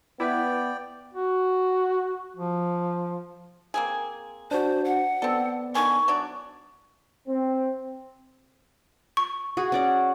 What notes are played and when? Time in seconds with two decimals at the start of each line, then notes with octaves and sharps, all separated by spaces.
0.20 B3 E4 B4 D5 G5
1.13 F#4
2.36 F3
3.74 A#3 C4 G#4
4.51 D4 F#4 C5
4.85 F#5
5.22 B3 C4 A4 D5
5.75 D3 D#3 G#5 C#6
6.08 F#3 D4 D5
7.28 C4
9.17 C#6
9.57 F#4 G#4
9.72 C#4 D5 F#5